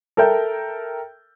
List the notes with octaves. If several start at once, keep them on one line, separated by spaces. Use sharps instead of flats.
A4 A#4 E5 G5 G6